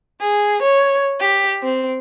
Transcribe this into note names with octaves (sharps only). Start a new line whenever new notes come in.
G#4
C#5
G4
C4